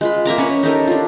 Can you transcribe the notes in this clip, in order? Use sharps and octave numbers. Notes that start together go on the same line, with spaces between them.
G#3 F4 B5
A#3 E5 A#5 D6
C#4 B4 C#5
D#4 G4 A4 A#4
D4 F4